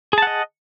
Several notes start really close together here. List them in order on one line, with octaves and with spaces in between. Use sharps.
G#4 A5 F#5 D#5